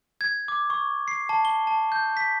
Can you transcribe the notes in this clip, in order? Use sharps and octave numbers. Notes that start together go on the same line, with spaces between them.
G#6
D6
C#6
C7
A5
G7
A5
G6
B6